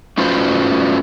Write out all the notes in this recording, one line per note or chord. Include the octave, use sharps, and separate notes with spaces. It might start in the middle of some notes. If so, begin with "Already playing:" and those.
A3 C#4 F4 F#4 B4 C5